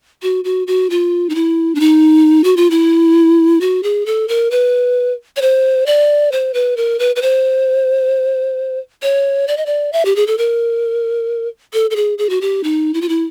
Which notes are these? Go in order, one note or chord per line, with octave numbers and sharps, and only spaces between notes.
F#4
F#4
F#4
F4
D#4
E4
D4
D#4
F#4
F4
E4
F#4
G#4
A4
A#4
B4
C#5
C5
D5
C5
B4
A#4
B4
B4
C5
C#5
D5
D#5
D5
E5
G4
G#4
A4
A#4
A4
A4
G#4
G#4
F#4
G4
D#4
E4
F4
E4